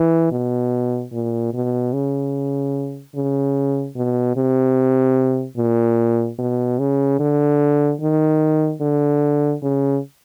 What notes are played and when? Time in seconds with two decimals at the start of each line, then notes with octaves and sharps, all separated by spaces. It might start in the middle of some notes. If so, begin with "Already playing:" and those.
Already playing: E3
0.32 B2
1.12 A#2
1.53 B2
1.93 C#3
3.15 C#3
3.96 B2
4.36 C3
5.57 A#2
6.39 B2
6.79 C#3
7.19 D3
8.01 D#3
8.81 D3
9.62 C#3